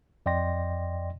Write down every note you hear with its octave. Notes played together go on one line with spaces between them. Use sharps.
F2 D5 D#5 G5 C6 A#6